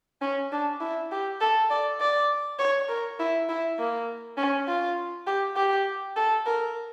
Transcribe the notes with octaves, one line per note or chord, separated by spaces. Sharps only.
C#4
D4
E4
G4
A4
D5
D5
C#5
A#4
E4
E4
A#3
C#4
F4
G4
G4
A4
A#4